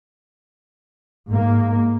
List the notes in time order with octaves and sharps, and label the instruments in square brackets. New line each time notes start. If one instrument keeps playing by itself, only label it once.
[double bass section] G#2 A#3